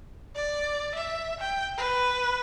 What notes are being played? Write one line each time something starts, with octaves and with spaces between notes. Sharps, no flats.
D5
E5
G5
B4